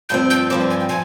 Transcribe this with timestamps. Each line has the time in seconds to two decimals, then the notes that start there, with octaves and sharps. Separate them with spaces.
0.09 G2 F3 C4 G6
0.30 G6
0.50 G2 F3 C4 D6
0.60 C6
0.70 G#5
0.80 G5
0.89 F3 G#5